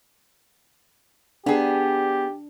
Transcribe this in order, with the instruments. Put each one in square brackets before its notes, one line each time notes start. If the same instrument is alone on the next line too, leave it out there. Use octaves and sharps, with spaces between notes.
[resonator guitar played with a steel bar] B3 G#4 [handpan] D4 [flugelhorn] G4